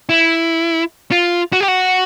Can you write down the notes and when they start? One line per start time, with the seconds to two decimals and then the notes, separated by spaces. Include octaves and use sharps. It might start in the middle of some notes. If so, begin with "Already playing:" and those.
0.09 E4
1.12 F4
1.53 F#4
1.60 G4
1.68 F#4